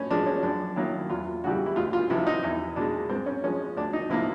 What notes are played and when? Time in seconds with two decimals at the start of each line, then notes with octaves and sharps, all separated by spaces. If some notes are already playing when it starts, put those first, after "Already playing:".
Already playing: A2 C#4
0.11 F3 G#3 D4
0.26 C#4
0.43 F#2 D4
0.76 D#3 F#3 A#3 E4
1.09 E2 F4
1.44 C#3 E3 G3 F#4
1.66 E4
1.76 D2 F4
1.93 F4
2.10 C3 F3 E4
2.27 D#4
2.43 E2 E4
2.76 B2 G#3 D4
3.09 G#2 C4
3.26 C#4
3.44 F3 G#3 C#4
3.77 D2 D4
3.93 D#4
4.10 C3 F3 A#3 E4